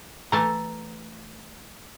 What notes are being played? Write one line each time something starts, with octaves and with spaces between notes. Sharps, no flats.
E3 A3 A5 A#5